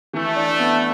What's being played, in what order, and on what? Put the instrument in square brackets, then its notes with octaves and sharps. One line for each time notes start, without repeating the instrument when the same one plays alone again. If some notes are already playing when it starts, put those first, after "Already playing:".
[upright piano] E3 [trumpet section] A3
[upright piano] D4
B3